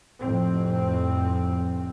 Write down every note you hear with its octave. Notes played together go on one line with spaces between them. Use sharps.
F1 F2 A2 C4